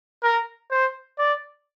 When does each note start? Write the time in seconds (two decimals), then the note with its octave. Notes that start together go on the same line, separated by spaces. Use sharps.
0.23 A#4
0.71 C5
1.18 D5